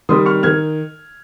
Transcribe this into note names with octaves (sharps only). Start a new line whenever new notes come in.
D#3 G3 C4 C6 D#6
C#6 F6
D#3 F6 G#6